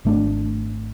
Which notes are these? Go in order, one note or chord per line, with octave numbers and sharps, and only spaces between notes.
G#1 A3 D4